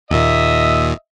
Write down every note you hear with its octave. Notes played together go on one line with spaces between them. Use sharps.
D#2 A#2 D#5 E5